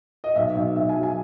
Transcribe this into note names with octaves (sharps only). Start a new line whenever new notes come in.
D#5
B1 E5
B1
B1 E5
G#5
F#3
G#5